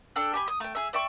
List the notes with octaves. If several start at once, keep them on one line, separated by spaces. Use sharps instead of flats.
D4 A4 G5 F#6
G4 G#5 B5
D#6
A3 G5
G#4 E5
D5 E5 G5 C#6